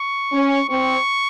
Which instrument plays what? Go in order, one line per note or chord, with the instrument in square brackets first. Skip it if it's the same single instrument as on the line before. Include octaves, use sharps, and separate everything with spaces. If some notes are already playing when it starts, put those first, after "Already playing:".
Already playing: [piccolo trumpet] C#6
[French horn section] C#4
[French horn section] C4 [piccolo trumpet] C#6